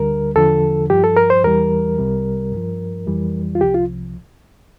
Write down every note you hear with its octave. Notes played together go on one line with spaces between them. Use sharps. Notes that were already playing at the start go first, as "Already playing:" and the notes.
Already playing: D2 D3 G3 A#4
E2 D3 F3 A4
G2 F3 G4
A4
A#4
C5
E2 E3 G3 A#4
C2 C3 G3
G2 F3
F2 E3 G3
F4
C2 C3 F3 G4
F4